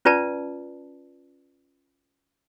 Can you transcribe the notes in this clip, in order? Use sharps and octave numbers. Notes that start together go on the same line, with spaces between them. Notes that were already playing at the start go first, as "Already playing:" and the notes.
C#4 F4 B4 D5 A5